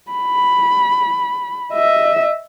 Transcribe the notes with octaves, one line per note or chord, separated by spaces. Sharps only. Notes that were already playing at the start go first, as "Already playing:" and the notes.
B5
D#5 E5